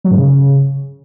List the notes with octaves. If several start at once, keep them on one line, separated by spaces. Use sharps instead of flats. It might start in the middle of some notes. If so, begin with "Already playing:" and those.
F#3
G#2
C#3